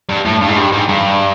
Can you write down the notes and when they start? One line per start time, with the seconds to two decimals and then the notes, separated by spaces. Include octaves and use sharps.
0.09 G2
0.25 A2
0.41 G2
0.49 G#2
0.58 G2
0.73 G#2
0.89 G2